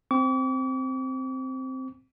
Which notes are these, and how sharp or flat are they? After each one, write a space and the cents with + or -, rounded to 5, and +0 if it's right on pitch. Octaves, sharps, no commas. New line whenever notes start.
C4 +0 D6 -45